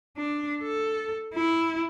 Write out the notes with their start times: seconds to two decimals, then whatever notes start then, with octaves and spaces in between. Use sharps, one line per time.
0.17 D4
0.62 A4
1.35 E4